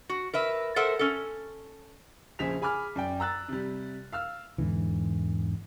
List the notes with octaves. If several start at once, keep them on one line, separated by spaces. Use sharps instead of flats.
F#4
A#4 B4 E5
A4 A#4 C5 E5 F#5
C#4 A4
A#1 C#3 G#4 C5 B6 F7
G#4 G#5 B5 D6 F6
F#2 D5 G5
A#5 E6 F#6 A6
C3 G3
F5 E6 F6
E2 G#2 D3 E3